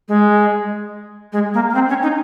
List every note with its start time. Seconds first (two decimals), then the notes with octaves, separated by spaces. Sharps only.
0.08 G#3
1.32 G#3
1.54 A#3
1.70 A#3
1.74 C4
1.89 C#4
2.02 D#4